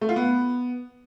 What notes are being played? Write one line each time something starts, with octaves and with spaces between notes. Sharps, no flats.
A3
F4
B3